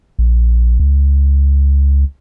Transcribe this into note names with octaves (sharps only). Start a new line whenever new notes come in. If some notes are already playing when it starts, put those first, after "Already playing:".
A#1
C#2